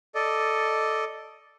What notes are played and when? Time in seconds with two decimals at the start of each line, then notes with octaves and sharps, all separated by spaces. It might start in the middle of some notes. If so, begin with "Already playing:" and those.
0.15 A4 D5 D#5